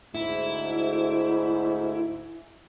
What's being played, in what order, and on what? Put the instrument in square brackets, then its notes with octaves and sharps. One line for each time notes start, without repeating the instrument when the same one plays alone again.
[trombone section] D2 G#2 [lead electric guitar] E4